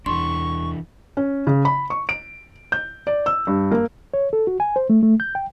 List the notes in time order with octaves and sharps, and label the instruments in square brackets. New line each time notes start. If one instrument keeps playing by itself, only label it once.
[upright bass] E2 [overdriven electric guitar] E3 D4 [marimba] C6 [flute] C#6
[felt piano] C#4
C#3
B5
C#6
D7
G6
D5
E6
G2
A#3
[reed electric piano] C#5
A4
F#4
G#5
C5
A3
A3
G6
G5